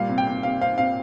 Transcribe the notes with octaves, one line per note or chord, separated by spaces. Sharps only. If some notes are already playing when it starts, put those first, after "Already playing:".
Already playing: A#2 G3 F5
C3
G5
C3
C3 F5
C4 F5
C4 F5